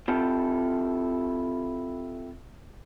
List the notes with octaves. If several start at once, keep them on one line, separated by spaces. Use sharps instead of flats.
C4 E4 F4 G4 A4